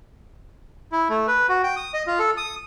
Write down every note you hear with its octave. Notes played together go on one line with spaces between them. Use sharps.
E4
A3
B4
F#4
G5
D#6
D#5
F4
A4
D#6